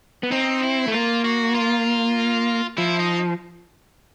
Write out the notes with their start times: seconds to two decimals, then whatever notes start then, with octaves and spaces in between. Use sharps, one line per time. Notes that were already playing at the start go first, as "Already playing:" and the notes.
0.23 B3
0.32 C4 D#4
0.63 E4
0.88 A3
0.93 A#3 F4
1.24 F#4
1.55 F4
2.78 F3 E4
2.99 D#4